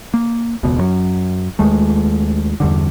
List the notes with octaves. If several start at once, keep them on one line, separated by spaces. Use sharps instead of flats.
A#3
E1 C#2 B2
F#2 F#3
D#2 G#3 A3
E2 G2 D3